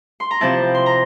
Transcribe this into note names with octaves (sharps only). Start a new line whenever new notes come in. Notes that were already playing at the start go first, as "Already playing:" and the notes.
C6
A#5
C3 F3 C4 E4 A5
C6
A#5